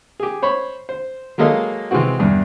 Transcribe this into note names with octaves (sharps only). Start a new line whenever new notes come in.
G4 G#4
C5 C#5 B5
C5
F#3 G#3 A#3 A4 D#5 F5
C3 E3 G#3 C4 F#4
E2 G2